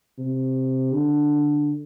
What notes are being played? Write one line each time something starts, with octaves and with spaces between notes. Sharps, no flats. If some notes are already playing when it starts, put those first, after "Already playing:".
C3
D3